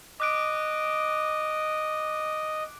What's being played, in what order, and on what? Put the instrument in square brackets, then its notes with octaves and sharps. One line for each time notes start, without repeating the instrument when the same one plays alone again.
[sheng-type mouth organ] D#5 [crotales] D6 F#6 D7